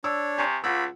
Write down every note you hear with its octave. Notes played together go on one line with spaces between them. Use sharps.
D4 C#5 E6
C3 G#5 C#6
C#2 F4 F#5 B5 E6